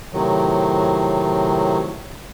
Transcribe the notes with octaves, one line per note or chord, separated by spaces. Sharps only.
A2 C3 D#3 F#3